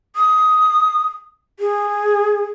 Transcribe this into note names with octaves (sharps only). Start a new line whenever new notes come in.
D#6
G#4